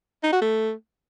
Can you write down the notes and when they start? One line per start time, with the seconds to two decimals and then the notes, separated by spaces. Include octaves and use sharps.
0.23 D#4
0.33 F#4
0.42 A3